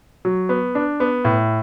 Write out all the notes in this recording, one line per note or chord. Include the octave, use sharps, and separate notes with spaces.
F#3
B3
D4
B3
A2